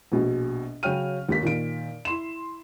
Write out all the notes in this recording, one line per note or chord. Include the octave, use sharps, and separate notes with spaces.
A#1 B2
C#3 F#3 C#5 G5 F6 D#7
D#2 G4 B6
A#2 D#3 D7
E4 C6 E7